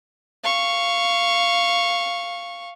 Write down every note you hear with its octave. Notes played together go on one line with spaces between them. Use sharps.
F5 C#6